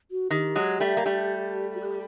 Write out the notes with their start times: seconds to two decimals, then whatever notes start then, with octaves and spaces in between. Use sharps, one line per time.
0.11 F#4
0.30 D#3 G4
0.55 F#3 G#3
0.80 G3 A3
0.97 A#3
1.06 G3 A3
1.75 F#4
1.81 G4